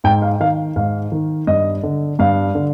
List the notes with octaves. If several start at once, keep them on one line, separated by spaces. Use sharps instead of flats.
G#2 G5
F5
D#3 F5
G#2 F5
D#3
G2 D#5
D3
G2 F5
D3